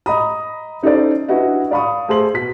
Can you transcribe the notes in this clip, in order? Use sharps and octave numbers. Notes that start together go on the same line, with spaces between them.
D#5 A#5 B5 D#6
C#4 D#4 E4 A4 C5 D5
D4 E4 F#4 B4 D#5 F#5
D5 F5 B5 C#6 D#6
A3 G#4 C5 C6 F#7
B2 B6